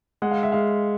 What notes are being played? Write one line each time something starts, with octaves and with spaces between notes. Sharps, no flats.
G#3 F#5
F5
E5
G#3 F5